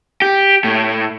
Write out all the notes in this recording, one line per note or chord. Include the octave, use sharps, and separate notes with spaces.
G4
A2